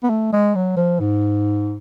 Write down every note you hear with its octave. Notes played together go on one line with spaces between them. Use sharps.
B3
A3
G#3
F#3
F3
G#2